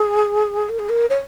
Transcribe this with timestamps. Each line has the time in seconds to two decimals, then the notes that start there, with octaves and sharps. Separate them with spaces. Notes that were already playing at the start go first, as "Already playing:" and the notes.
Already playing: G#4
0.69 A#4
0.79 G#4
0.89 A#4
1.09 C#5